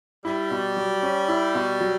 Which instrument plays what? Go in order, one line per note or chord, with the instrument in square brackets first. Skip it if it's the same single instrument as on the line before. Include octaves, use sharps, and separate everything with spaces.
[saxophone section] G3 [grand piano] E4
[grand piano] B2
F#3
C#4
E4
B2
F#3